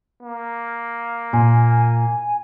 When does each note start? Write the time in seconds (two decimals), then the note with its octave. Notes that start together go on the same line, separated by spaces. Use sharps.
0.23 A#3
1.33 A#2 G#5